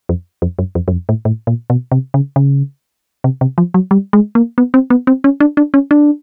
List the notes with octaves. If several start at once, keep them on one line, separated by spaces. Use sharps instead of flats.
F2
F2
F#2
F2
F#2
F2
A2
A2
A#2
B2
C3
C#3
C#3
C3
C3
F3
F#3
G3
G#3
A#3
B3
C4
B3
C4
C#4
D4
D4
C#4
D4